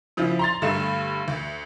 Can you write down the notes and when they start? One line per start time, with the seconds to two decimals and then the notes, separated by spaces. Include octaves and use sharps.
0.17 C#3 F3 E4
0.39 A#5 C6 A6
0.62 G2 D3 A3 E7
1.28 D2